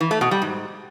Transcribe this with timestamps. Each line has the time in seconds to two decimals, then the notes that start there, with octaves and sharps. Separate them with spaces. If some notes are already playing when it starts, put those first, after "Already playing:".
0.01 E3
0.11 A3
0.21 B2
0.31 G3
0.42 G#2